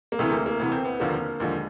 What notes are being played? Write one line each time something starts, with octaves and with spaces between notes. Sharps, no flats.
A#3
D2 C3 E3 A3
A#3
A#3
D2 C3 E3 B3
C4
B3
D#2 D3 F3 A#3
D#2 D3 F3 G#3